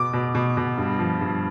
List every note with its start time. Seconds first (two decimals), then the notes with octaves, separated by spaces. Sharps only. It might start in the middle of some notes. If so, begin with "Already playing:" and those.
Already playing: B2 D6
0.13 B2
0.35 B2
0.57 B2
0.77 G2
0.99 F3
1.21 G2